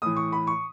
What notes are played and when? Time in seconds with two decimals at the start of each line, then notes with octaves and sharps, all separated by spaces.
0.02 A2 E3 D#6
0.16 C#6
0.32 B5
0.47 C#6